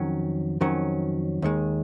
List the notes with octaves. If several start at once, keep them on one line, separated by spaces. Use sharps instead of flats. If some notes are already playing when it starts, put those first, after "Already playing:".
Already playing: F2 D#3 F#3 C#4
F2 D#3 F#3 C#4
D#2 D#3 G#3